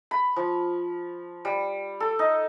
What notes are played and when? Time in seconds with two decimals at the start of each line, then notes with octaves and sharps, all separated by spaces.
0.11 B5
0.36 F3
1.45 G3
2.00 A4
2.19 D#4